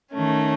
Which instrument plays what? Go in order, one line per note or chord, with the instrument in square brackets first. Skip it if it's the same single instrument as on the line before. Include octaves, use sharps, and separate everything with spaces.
[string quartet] D#3 A3 C#4